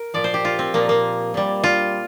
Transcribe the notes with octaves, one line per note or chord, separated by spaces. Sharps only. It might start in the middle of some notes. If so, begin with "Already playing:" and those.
Already playing: A#4
A#2 F3 D5
C5
G4
F4
C4
A#2 F3 A#3
A#3
A#2 G3
F4